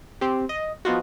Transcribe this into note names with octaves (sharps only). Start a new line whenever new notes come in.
C4 G4
D#5
F3 B3 D#4 F4 F#4